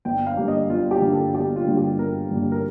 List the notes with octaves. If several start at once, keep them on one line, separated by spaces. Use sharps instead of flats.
G1 G5
F5
G2 D3 G3 A#3
D#5
G1 F4
G4
G2 D3 G3 A#3
A4
G1 G4
F4
G2 D3 G3 A#3
G4
G1 A#4
G2 D3 G3 A#3
A#4